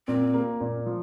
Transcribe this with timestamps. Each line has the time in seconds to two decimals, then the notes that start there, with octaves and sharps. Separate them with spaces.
0.08 A#2 C4
0.34 A#3
0.61 A#2
0.86 F3